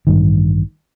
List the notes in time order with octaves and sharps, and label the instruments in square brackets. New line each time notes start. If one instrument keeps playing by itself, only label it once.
[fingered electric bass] A1 G2 D#3